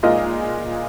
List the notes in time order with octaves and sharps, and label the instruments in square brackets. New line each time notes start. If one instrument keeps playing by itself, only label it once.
[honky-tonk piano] A#2 G#3 D#4 A#4 D#5 [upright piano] F4